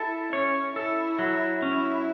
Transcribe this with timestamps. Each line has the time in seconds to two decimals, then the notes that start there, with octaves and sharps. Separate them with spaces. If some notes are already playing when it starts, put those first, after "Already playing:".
Already playing: E4 A4
0.33 C#4 C#5
0.76 E4 A4
1.19 F#3
1.62 C#4 E4